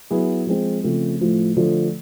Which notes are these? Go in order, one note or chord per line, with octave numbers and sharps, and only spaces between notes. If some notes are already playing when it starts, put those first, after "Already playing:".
F#3 B3 E4 G#4
F3 G#3 C4 F4
C#3 F3 A3 C4
A2 F3 A3
D3 F3 A3